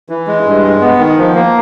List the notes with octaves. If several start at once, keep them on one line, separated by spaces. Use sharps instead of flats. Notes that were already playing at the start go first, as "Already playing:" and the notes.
E3
G#3
G2
G#3
B3
D#3
F3
A#3